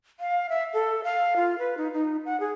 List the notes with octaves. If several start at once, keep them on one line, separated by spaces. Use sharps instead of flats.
F5
E5
A4
F5
F4
B4
D#4
D#4
F#5
G#4